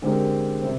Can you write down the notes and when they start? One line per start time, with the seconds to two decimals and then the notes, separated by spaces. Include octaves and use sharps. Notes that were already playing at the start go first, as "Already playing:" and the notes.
0.02 D3 G#3 C4 G4 A#4
0.62 C3 G3 C4